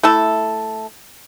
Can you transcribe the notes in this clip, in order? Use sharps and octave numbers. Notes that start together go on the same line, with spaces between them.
A3 E4 A4